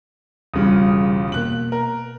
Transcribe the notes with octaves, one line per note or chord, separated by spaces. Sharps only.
E1 C#3 G3 F4 D#6
B2 A#3 F#6 F#7
A#4